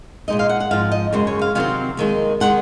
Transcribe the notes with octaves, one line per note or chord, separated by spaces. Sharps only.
A#2 G#3 D#4 D#5
F5
F#5
F#5
G#2 F3 C4 F5
D#5
F#2 C#3 G#3 C5
C#5
F5
C3 D#3 F#3 C4 F5
D#2 D#3 G#3
C3 D#3 G#3 F#5